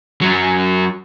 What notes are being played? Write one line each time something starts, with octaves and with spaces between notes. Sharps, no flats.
F#2 F#3